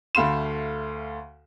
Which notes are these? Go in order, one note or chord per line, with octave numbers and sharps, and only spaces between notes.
D2 A3 F5 B5 C6 E7